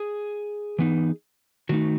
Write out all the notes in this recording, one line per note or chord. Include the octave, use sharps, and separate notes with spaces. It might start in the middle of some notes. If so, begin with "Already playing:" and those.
Already playing: G#4
E3 B3 D#4
D#3 A3 D#4 F#4